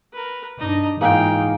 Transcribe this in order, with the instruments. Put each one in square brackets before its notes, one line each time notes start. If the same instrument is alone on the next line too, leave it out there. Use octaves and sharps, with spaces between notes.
[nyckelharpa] A#4 B4
[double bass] G2 D4 [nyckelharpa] D#4 D#5
[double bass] G#2 E3 [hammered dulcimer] A#3 D#4 G#4 [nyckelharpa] F4 G5